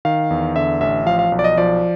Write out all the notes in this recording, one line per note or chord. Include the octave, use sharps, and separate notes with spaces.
D#3 F5
E2
D3 E5
A1 E5
F3 F5
F5
B1
D5
D#5
F3 D5